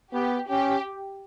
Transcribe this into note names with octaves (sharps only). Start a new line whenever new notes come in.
B3 G4
C#4 G4